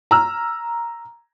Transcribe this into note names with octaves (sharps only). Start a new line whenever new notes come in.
A#5 E6 F6